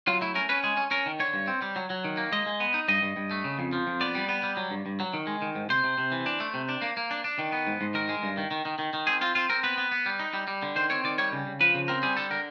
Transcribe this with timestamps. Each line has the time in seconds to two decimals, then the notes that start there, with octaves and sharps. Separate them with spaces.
0.07 F#3 F4
0.21 A3 E4
0.35 C#4 A#4
0.49 C#4 B4
0.64 G#3 G#4
0.77 C#4
0.91 C#4 A#4
1.06 D#3
1.20 D3 C#5
1.34 G2
1.47 C4
1.62 G3
1.76 F#3
1.90 F#3
2.04 D#3
2.17 A#3
2.32 G#3 D#5
2.46 G#3
2.60 B3
2.74 D#4
2.88 G2 D#5
3.02 G2
3.16 G2
3.31 A3
3.44 C#3
3.59 F2
3.73 F3
3.87 F2
4.01 B3 D5
4.15 G3
4.28 B3
4.43 G3
4.57 F#3
4.71 G2
4.86 G2
5.00 F#3
5.13 D#3
5.27 G#3
5.42 D#3
5.55 G#2
5.70 C3 C5
5.84 C3
5.98 C3
6.12 E3
6.26 D4
6.40 A3
6.54 C3
6.69 D4
6.82 A#3
6.97 A#3
7.11 D4
7.24 D4
7.39 D#3
7.52 B3
7.67 G#2
7.81 G#2
7.94 D#3 A#4
8.09 G#3
8.23 G2
8.37 D#3
8.51 D#3
8.65 D#3
8.79 D#3
8.93 D#3
9.07 C4 G#4
9.21 C4 F4
9.35 C4 F4
9.50 C4 A#4
9.63 B3 B4
9.78 B3
9.91 B3
10.06 G3
10.19 D#4
10.34 G3
10.48 G3
10.63 D3
10.76 D#3 C5
10.90 C4 C#5
11.04 D#3 D5
11.18 G3 C#5
11.32 C#3
11.46 C#3
11.61 F3 B4
11.74 C#3
11.88 C4 A#4
12.03 G3 G#4
12.17 D3 A4
12.30 D3 A#4